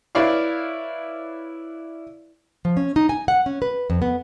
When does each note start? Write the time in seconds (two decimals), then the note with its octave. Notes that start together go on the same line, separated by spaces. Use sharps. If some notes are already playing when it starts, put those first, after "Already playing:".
0.15 E4 B4 C#5 D5 F5 C#6
2.65 F3
2.77 C#4
2.96 D#4
3.09 G#5
3.28 F#5
3.46 C#4
3.62 B4
3.90 F2
4.02 B3